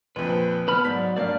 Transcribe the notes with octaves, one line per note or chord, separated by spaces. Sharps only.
A#1 F2 B4
B3 B4 A5 B5 F6
G#2 F#3 D5 B6
G2 A#3 D5 F5